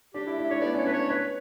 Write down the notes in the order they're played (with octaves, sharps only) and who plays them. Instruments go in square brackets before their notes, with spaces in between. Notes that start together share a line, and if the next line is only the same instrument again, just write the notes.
[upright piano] D4 [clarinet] G4
[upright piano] E4
E4
[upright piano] D4 [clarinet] C#5
[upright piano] B3 [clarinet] D5
[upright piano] C#4 [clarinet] C#5
[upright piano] D4 [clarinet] B4
[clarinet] C#5
[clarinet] B4 [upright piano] C#5